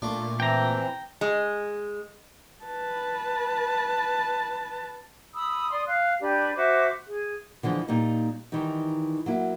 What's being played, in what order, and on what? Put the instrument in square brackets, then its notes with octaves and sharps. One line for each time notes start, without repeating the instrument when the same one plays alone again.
[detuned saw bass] A#2 [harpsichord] A3 D4 F4
[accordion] E3 C4 [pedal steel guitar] G5 A#5
[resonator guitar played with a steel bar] G#3
[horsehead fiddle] B4 A5
[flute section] B5 D#6 E6
D5 C6 D#6
F5 F#6
D4 G4 B4
F#4 C5 E5 D6
G#4
[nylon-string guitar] D3 E3 F3 G#3
A#2 G3 A#3 D#4 D#5
D#3 E3 G3 D#4
F#3 A#3 E4